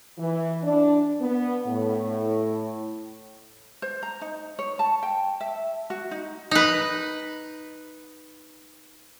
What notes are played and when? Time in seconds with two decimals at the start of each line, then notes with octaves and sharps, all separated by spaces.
0.18 E3
0.64 D4
1.20 B3
1.67 A2
3.82 C5
4.03 A#5
4.21 D#4
4.59 C#5
4.79 A5
5.03 G5
5.41 E5
5.90 F#4
6.11 D#4
6.51 D#4 B4